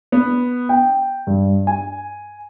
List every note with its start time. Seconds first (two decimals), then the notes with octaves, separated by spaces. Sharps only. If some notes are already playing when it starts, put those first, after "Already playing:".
0.12 B3
0.69 G5
1.27 G2
1.67 G#5